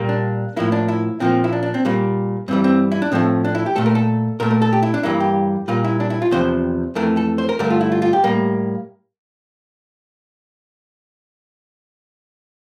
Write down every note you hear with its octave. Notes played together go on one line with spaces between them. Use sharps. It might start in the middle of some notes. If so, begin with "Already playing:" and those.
Already playing: A#2 G3 A#3
D4
A2 F3 A#3 E4
D4
E4
A#2 F3 A#3 C4
E4
D4
D4
C4
A#2 G3 A#3
G2 E3 G3 C4
C4
E4
D4
A2 F3 A3 C4
D4
E4
G4
A#2 A3 A4
A#4
A4
A#2 A3 A#4
A#4
A4
G4
E4
D4
G2 E3 G3 A#3 E4
G4
A#2 G3 A#3 F4
E4
D4
E4
F4
E2 C3 F3 C5
F2 E3 A3 A#4
A4
C5
A#4
G2 D3 A3 A#4
F4
E4
F4
F4
G4
A2 G3 A#3